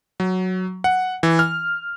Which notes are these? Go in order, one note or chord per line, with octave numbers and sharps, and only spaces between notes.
F#3
F#5
E3
F6